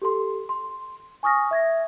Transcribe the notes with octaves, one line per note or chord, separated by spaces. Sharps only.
G4 A4 C6
C6
G#5 C#6 D#6 F6 A#6
E5 G#6 A#6